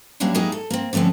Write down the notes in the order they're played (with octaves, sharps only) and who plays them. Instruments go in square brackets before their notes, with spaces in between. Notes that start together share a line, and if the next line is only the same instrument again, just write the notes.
[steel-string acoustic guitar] F#3 G3 A#3 C#4 D4 E4
G#3 A#3 D#4 E4 G4 G#4
A4
A#3 C4
D3 F3 A3 C4 C#4